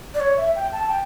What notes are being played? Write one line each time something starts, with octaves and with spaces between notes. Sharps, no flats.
D5
C#5
E5
G5
A5
G5